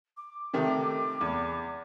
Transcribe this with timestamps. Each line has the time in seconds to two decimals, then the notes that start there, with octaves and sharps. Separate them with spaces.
0.17 D6
0.53 C3 D#3 A3
1.21 E2